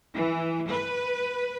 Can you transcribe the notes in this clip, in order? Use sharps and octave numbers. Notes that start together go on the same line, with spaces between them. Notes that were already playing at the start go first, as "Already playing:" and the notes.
E3
B4